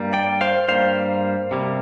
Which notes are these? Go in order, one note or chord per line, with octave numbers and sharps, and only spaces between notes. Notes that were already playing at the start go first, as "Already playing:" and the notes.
Already playing: G2 G3 A#3
D5 G5
C5 F5
G2 G3 A#3 C5 F5
C3 G3 A#3